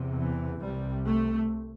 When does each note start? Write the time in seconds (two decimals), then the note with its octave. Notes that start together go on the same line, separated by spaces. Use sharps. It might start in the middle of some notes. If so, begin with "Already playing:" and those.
Already playing: E2 C3
0.15 E3
0.61 C2 C3 G3
1.06 A3